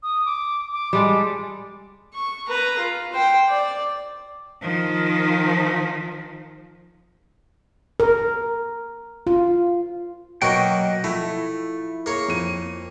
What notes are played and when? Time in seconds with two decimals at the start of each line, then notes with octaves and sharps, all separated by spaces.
0.03 D#6
0.25 D6
0.73 D6
0.93 G3 G#3 A4
2.14 C#6
2.48 B4 A#5
2.79 F4
3.13 C5 G5
3.48 D5
4.61 D#3 F3
8.00 A#4
9.27 F4
10.42 B2 F#3 A#3 F#4 D#5 G5 C#6
11.04 F3 A3 E4
12.06 A#3 G#4 C#5
12.28 F2 D#7